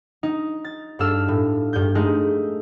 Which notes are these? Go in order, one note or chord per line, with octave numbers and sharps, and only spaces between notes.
D#4
A6
G2 D4 A4 F5 E6
A2
G2 G6
G#3 A3 D#4